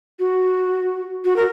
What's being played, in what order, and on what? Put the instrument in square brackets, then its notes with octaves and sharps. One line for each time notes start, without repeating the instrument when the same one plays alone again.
[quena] F#4
F#4
A#4